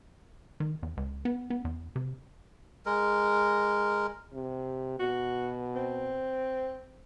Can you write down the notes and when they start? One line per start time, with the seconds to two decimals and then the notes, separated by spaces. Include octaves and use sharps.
0.60 D#3
0.83 E2
0.97 C#2
1.25 B3
1.50 B3
1.65 E2
1.96 C3
2.86 G#3 A#4
4.34 C3
4.99 B2 F#4
5.75 C4